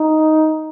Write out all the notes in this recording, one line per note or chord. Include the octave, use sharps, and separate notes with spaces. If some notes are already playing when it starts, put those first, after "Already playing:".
Already playing: D#4